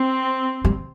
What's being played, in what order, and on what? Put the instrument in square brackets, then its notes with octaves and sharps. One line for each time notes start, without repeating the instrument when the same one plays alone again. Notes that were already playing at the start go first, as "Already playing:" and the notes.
Already playing: [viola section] C4
[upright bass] G3